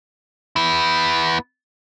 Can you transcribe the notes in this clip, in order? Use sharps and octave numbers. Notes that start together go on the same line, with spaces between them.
B3 E4